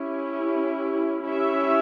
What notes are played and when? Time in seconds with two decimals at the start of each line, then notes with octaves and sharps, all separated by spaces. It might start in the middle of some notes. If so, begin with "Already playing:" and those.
Already playing: C#4 E4 G4
1.24 C#4 E4 G4 C#5 E5